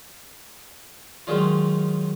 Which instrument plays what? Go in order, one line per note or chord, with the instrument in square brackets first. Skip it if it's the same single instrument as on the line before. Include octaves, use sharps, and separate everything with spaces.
[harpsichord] D#3 F#3 G#3 C#4 F4